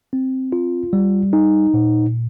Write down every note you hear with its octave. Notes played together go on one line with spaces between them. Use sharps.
C4
F4
G3
D#4
A#2